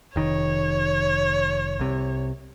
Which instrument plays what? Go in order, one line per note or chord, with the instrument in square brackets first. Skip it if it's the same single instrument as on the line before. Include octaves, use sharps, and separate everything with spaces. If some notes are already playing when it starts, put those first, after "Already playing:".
[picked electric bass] F1 D#3 [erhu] C#5
[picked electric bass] C2 C3